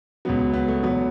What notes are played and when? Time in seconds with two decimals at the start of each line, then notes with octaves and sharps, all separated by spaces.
0.25 C#2 B2 F#3 B3
0.53 B3
0.68 A3
0.83 E2 B2 F#3 B3